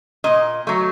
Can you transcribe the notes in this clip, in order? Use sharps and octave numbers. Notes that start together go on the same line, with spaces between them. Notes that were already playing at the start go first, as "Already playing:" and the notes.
A#2 D#5
F#3 A3